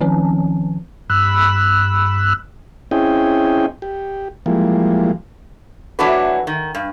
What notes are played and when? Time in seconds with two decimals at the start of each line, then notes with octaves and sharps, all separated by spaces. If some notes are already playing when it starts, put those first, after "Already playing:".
0.01 D#3 F3 C4 C#4
1.10 G2 B5 E6 F#6
2.91 C4 C#4 E4 G#4 D#5 G5
3.82 G4
4.46 E3 F3 G3 G#3 A#3
5.99 E3 F#3 A3 D4 F#4 B4
6.47 D#3
6.75 G2